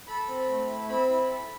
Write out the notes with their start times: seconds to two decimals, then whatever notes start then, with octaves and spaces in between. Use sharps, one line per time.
0.07 A4 B5
0.27 C4
0.49 A3
0.68 E4
0.89 C4 B5
1.10 E4
1.29 A4